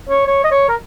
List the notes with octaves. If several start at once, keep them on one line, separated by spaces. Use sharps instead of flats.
C#5
C#5
D#5
C#5
A#4